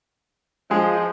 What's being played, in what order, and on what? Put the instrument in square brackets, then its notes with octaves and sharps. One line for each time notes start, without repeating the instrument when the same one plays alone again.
[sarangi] F3 [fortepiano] G#3 G#4